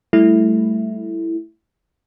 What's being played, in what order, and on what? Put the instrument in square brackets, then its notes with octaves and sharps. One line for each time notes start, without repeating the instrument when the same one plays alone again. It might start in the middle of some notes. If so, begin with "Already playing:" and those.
[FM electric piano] G3 A3 E4